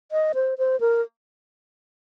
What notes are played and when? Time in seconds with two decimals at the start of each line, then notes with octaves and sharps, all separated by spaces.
0.12 D#5
0.35 C5
0.58 C5
0.80 A#4